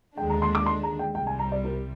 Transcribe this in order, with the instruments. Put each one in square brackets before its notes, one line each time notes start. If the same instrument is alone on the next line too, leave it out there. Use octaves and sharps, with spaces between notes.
[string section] D#2 D3 G#3 D4 [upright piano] G5
[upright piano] A#5
C6
D6
C6
A#5
G5
[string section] C2 C3 G3 [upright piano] G5
[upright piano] G#5
A#5
D5
A#4